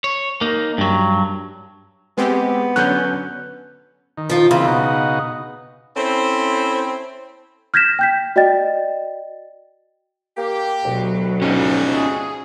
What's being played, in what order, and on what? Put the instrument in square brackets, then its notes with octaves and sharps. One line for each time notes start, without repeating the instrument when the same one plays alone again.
[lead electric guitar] C#5
A#3 D#4
G2 F#3
[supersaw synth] G#3 C4 G4 [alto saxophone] B3
[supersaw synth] D3 F#3 C#4 [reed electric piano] F#6 G6
[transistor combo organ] D#3
[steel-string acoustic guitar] F3 F4
[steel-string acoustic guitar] C#3 [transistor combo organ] E3 A#3 C4
[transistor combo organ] B2 D#4 F#4
[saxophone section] C4 C#4 E4 A4 C5
[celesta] F6 G6 G#6 A#6 B6 E7
G5 G6 B6
F#4 D5 D#5 G5 A6
[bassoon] A#3 [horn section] G4
[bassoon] D2 [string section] B2 F#3
[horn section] C3 F4 F#4 [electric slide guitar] C#4 D#4
[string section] G#4